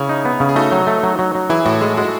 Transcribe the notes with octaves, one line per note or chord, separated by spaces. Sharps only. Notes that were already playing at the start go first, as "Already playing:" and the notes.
Already playing: C#3 C#4 E4
D#4
B3
C#3
G#4
A3 D#4 F#4
F#3
A3
F#3
F#3
F#3
E3 E4 G#4
A2 F#4 A4
G#3 E4 G#4
G#3 F#4
E4